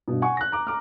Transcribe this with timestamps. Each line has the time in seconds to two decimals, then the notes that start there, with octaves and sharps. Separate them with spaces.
0.08 G2 B2
0.22 F#5 G#5 C#6
0.37 F#6 A#6
0.52 A#5 D6
0.67 A#5 D6 F6